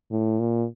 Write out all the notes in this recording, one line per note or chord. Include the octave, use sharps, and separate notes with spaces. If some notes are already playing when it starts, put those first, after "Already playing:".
A2
A#2